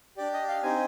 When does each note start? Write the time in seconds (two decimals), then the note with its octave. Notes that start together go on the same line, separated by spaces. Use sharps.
0.17 D4 G4 D5
0.33 D#5
0.48 F5
0.63 C4 D#4 G4 G#5